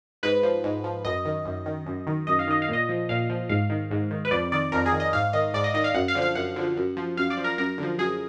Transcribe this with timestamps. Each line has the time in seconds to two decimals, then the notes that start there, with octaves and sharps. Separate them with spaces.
0.23 G#2 B4
0.43 F3
0.64 G#2
0.84 F3
1.05 F#2 D#5
1.25 D#3
1.46 F#2
1.66 D#3
1.86 F#2
2.07 D#3
2.27 F#2 D#5
2.39 F5
2.48 D#3 D#5
2.62 F5
2.69 A#2 D#5
2.89 F3
3.09 A#2 F5
3.29 F3
3.49 G#2 F5
3.70 D#3
3.91 G#2
4.11 D#3
4.25 B4
4.31 F2 D5
4.52 D#3 D5
4.72 F2 A#4
4.86 G#4
4.92 D#3
5.00 D#5
5.13 G#2 F5
5.33 D#3 D#5
5.54 G#2 D5
5.64 D#5
5.74 D#3 D#5
5.84 F5
5.94 F#2 F#5
6.08 F5
6.15 D3 F3
6.22 F5
6.35 F#2 F#5
6.56 D3 F3
6.77 F#2
6.97 F3
7.17 F#2 F5
7.30 D5
7.37 F3
7.44 A#4
7.58 F#2 A#4
7.78 D3 F3
7.98 F#2 G#4